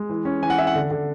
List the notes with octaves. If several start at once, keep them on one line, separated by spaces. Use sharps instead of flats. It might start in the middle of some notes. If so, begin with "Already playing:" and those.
Already playing: G#3
E3
C#4
E3 G#5
F#5
E3 E5
F#5
D3
D3